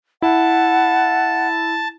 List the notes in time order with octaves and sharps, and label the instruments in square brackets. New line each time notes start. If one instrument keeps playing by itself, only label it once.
[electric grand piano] E4 [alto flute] F#5 [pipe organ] A5